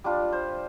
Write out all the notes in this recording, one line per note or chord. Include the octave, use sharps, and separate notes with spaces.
G3 D4 F4
C5